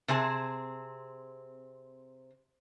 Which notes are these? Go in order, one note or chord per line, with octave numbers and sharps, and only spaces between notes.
C3 C4 G#4 A5